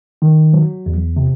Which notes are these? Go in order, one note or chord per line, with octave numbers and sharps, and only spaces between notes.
D#3
F#3
E2
C3